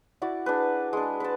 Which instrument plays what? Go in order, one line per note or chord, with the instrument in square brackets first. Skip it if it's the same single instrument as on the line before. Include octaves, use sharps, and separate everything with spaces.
[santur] E4 F#4 D5
D4 G#4 B4
G#3 D4
B4 A5